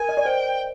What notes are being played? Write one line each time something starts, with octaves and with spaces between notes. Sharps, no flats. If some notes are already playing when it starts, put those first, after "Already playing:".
Already playing: A#4 G#5
D#5
D5
C5 G5